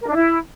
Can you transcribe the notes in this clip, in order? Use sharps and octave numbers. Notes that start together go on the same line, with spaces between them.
A#4
D4
E4